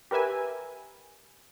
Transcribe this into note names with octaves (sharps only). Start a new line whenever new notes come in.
G4 A#4 B4 E5 G#5